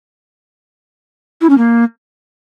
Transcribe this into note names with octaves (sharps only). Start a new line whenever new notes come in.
E4
C#4
A#3